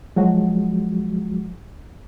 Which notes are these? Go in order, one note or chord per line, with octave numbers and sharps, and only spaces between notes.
F3 F#3 G#3 F#4